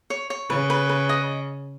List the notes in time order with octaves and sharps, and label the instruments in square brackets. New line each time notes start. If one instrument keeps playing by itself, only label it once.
[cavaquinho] C#5
C#5
[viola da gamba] C#3 [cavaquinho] B4
[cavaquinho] B4
B4
D#5